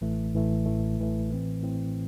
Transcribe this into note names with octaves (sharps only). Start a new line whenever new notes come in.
A1 A2 E3 A3
A1 A2 E3 A3
A1 A2 E3 A3
A1 A2 E3 A3
A2 E3 C4
A2 E3 C4